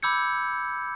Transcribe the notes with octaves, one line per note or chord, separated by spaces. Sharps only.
B5 D6 E6 G6 G#6 C#7